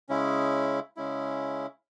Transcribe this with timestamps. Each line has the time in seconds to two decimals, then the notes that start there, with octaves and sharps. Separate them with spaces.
0.09 C#3 G#3 C#4 E4
0.97 C#3 G#3 C#4 E4